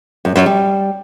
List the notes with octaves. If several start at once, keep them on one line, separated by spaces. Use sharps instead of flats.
F#2
F#2
G3